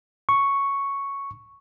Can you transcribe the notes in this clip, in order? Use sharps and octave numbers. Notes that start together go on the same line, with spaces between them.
C#6